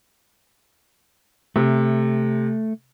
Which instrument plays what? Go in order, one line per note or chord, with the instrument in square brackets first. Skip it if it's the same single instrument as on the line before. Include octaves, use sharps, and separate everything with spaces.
[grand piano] C3 [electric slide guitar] A3